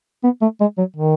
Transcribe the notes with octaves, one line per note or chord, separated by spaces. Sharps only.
B3
A3
G#3
F#3
D#3